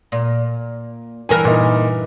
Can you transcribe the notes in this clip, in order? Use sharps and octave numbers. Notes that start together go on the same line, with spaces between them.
A#2
G2 E3 A#4 G#5
A#2 D#4